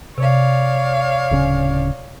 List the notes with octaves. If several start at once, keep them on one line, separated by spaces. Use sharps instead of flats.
C3 C#5 D5 F5
D1 C#3 C#4